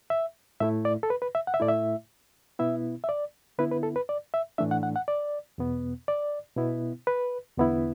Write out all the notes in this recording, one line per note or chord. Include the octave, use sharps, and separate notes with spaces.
E5
A2 A3 E4 E5
D5
A4
B4
B4
E5
F#5
E5
A2 A3 E4 D5
E5
B2 B3 E4 E5
E5
D5
D3 B3 E4 B4
B4
A4
B4
D5
E5
A2 E3 A3 D4 E5
F#5
F#5
F#5
D5
E2 B2 B3
D5
B2 B3 E4
B4
E2 D3 B3 E4